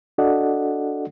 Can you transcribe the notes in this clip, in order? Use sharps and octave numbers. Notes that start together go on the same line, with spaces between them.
D4 F#4 A4 D5 D#5 F#5